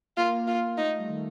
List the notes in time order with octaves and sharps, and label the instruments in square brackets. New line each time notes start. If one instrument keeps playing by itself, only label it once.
[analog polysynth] A#3 [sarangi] F4
[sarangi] F4
[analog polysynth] A#3
[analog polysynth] A3 [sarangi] D#4
[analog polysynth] A3
G3
D#3